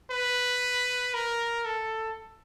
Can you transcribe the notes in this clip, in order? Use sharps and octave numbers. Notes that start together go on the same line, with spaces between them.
B4
A#4
A4